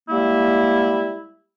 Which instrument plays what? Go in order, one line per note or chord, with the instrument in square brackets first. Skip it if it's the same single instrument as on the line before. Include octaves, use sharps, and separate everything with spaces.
[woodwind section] G3 G#3 A#3 E4